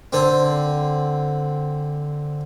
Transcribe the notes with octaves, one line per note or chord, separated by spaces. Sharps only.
D3 C4